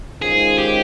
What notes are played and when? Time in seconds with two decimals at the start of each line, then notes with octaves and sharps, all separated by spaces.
0.22 D#3 G#3 C#4 F4 G#4 C5
0.58 G4